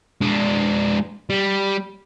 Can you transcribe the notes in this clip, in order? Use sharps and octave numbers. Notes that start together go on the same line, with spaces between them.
G#3 D4
G3